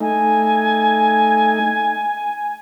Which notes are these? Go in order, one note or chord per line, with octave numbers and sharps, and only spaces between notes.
A3 D#4 G#5